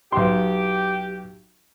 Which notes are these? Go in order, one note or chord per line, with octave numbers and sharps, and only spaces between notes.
B1 G4 C6